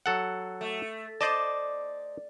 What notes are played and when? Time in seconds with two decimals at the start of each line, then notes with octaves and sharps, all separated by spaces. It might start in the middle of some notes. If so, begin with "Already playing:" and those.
0.06 F#3 A4 F#5
0.61 A3
1.21 C5 D5 D#5 A5